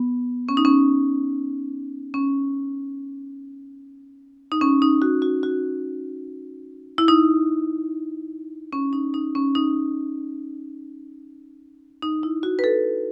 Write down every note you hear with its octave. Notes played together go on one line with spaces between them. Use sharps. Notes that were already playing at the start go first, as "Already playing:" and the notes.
Already playing: B3
C#4
D#4
C#4
C#4
D#4
C#4
D#4
F#4
F#4
F#4
E4
D#4
C#4
D#4
D#4
C#4
D#4
D#4
E4
F#4
B4
A4